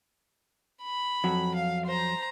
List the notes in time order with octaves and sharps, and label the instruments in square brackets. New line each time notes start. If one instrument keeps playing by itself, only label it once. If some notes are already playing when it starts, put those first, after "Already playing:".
[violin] B5
[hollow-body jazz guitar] F2 F#3
[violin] F5
C5 A#5